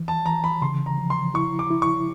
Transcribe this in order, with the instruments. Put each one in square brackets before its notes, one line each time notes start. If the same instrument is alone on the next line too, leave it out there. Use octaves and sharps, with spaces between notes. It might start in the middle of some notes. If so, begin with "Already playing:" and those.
Already playing: [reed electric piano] E3
[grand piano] A5
[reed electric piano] E3 [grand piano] A#5
[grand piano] B5
[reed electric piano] C#3 [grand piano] C6
[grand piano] A#5
[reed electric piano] F3
[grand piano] C6
[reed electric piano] E4 [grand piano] C#6
[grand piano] D6
[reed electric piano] E4
[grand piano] C#6